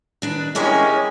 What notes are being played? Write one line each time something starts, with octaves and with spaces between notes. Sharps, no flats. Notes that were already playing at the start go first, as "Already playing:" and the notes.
D#3 D4 B4
G#3 C#4 E4 G4 A#4 C#5